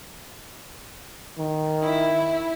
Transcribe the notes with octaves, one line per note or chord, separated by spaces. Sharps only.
D#3
E4